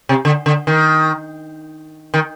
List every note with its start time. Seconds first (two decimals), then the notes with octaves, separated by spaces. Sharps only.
0.09 C3
0.25 D3
0.46 D3
0.67 D#3
2.14 D#3